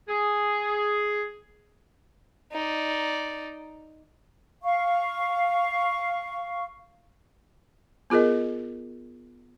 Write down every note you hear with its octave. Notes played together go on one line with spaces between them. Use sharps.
G#4
D#4 D5
F5 C#6
B3 F4 G#4 A#4 D#5